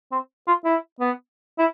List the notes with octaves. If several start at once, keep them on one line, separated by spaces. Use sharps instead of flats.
C4
F4
E4
B3
E4